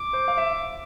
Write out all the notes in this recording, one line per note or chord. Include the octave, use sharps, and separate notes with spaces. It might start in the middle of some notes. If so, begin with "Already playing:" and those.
Already playing: D6
C5
F5
E5